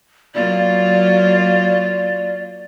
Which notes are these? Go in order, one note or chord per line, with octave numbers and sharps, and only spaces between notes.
F#3 A#3 F4 D5